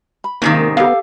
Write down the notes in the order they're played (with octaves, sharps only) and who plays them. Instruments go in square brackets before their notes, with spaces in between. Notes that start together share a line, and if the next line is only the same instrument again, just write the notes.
[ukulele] B5
[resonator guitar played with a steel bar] G#2 C3 D#3 [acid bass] A#3 [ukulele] C#4
[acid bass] B3 [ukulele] G4 A4 F5